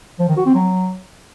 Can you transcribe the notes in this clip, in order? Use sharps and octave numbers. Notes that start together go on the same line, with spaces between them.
F3
D#3
F#4
C4
F#3